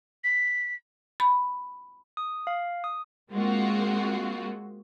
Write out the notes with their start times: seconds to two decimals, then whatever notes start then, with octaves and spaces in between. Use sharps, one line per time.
0.24 B6
1.20 B5
2.17 D#6
2.47 F5
2.84 D#6
3.31 G#3 A#3 C4 F4 F#4